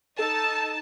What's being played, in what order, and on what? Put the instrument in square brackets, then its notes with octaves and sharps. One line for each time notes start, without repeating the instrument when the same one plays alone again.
[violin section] D#4 A5 [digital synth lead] A4